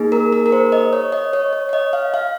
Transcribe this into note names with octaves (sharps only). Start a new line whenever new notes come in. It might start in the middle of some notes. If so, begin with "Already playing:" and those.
Already playing: A#3 D#4 G#4
A#4
A#4
A#4
C5
D#5
C#5
D#5
C#5
C#5
C#5
D#5
F5
F5